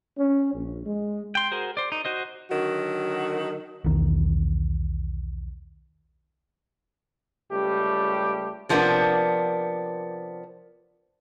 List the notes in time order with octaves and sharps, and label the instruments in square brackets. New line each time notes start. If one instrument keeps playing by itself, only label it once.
[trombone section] C#4
A#1
G#3
[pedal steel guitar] G5 C6
F#4 G#4 A#4 C5
C5 D5
D#4
F#4 C5 D#5
[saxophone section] D3 D#3 F#3 F#4
[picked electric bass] B1 E2 D#3
[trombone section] C#2 G3 A3 G4
[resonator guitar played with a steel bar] C3 F3 A#3 B3 D4